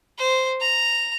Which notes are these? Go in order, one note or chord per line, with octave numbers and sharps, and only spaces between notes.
C5
A#5